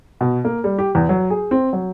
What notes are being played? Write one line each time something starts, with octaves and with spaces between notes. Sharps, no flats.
B2
A#3
G3
G4
E2
F#3
G#4
C4
F#3